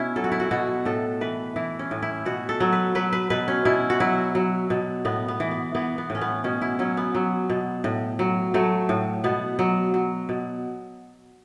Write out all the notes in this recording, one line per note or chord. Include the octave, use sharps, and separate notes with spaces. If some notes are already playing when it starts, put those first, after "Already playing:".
Already playing: B2 C#4 E4
F#3 A4
F#4
E4
F#4
B2 F#4
A2 A4
E3 B4
E3 E4
C#4
A2
E4
B2 F#4
A4
F#3
B4
F#3 B4
B4
B2 B4
C#4
B2 E4
F#4
F#3 E4
F#3
B2
A2 B3
B3
E3
B3
E3 B3
B3
A2
C#4
B3
B2 C#4
E4
F#3 C#4
B3
F#3
B2
A2
F#3
F#3 A3
A2
B2 B3
F#3
F#3
B2